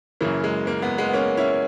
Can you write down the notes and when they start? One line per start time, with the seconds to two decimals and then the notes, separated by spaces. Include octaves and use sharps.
0.21 F#2 C#3 E3 A#3
0.44 G#3
0.67 A#3
0.82 G#3 B3
0.98 G#3 B3
1.09 B3
1.13 A#3 C#4
1.37 C#4 E4